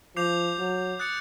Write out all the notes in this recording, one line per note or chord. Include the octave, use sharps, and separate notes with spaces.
F3 D6 G6 C7 F7
F#3
D#6 F#6 A6 C#7